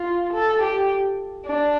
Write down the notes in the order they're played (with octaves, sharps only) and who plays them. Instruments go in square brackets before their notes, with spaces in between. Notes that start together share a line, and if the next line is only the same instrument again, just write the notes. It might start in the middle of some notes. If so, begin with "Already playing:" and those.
Already playing: [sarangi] F4
A4
G4
D4